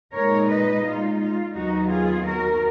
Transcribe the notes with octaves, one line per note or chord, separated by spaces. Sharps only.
A#2 G#3 D#4 A#4 C#5
B4 D#5
F4
F4
D#2 D#3 F#3 B3 D#4 F#4
F4 G#4
F#4 A#4